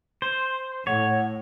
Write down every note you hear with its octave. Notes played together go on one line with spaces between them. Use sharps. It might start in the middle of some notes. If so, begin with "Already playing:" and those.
C5 C6
A2 C#5 F#5